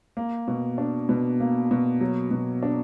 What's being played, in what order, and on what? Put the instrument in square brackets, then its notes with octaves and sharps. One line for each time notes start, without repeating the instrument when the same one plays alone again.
[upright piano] A#3
B2
D4
B2
A#3
B2
F#3
B2
D4